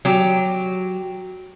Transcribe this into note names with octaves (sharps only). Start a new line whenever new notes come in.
F#3 G4